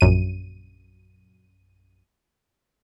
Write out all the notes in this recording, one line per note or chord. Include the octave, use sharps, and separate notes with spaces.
A#1 F#2 D#7